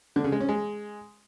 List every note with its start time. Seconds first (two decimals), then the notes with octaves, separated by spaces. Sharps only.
0.16 D3
0.24 C#3
0.32 G#3
0.40 C#4
0.49 G#3